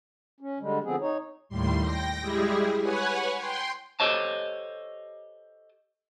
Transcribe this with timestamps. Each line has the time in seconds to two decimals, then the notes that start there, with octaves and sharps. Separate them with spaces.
0.40 C#4
0.60 D3 G3 G#3
0.84 D3 F3 B3 C4 G#4
1.00 D#4 C#5
1.49 D#2 A2 G3 C6
1.80 G5 A#6
2.21 G3 G#3 E4 G4 G#4
2.81 B4 C#5 F#5 G#5
3.35 G5 C6
4.00 G4 A4 C5 C#5 D#5 A5